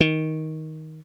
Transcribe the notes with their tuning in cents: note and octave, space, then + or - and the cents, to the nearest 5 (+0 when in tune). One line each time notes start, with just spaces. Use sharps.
D#3 +15